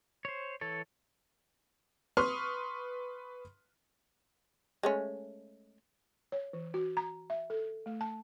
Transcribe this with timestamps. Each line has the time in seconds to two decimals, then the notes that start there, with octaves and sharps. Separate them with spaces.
0.25 C5 C#5
0.61 E3 A4 C#5
2.17 B4 C6 C#6 D#6 F6
4.83 G#3 A3 C#4
6.32 C#5
6.53 E3
6.74 F#4
6.97 A#5
7.30 E5
7.50 A4
7.86 A3
8.01 A5